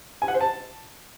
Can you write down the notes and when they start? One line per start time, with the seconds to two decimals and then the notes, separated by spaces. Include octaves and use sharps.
0.22 G#5
0.28 F#5
0.34 C5
0.41 A5